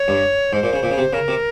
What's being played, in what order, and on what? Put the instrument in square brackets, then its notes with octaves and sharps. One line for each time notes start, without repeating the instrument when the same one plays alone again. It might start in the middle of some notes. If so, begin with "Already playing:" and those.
Already playing: [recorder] C#5
[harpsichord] G2
[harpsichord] G#2 [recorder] C5
[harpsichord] A#2
C#3
A#2
C#3
C3
[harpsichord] C#3 [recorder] A#4
[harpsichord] C3